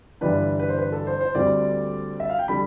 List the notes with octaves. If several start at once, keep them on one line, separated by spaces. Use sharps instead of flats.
G1 G2 E3 G3 D4 B4
B4
C5
B4
A4
C5
C5
D2 D3 G3 C4 D5
E5
F5
G5
D3 G3 B5